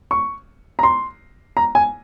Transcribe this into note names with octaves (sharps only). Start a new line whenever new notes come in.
C#6
A#5
C6
A#5
G#5